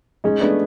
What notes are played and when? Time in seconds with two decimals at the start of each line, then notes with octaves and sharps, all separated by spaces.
0.24 G#3 C#4 D#4
0.41 A3 B3 D4